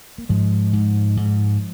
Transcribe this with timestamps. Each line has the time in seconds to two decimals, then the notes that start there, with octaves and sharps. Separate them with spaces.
0.18 A#3
0.29 G#2 F3 G#3
0.73 G#2
1.17 G#2